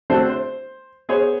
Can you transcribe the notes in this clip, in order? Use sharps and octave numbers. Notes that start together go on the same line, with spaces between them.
A3 C4 D4 F#4 C5
C5
B3 G#4 C5 C#5